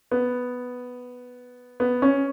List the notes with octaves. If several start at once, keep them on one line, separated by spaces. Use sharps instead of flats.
B3
B3
C#4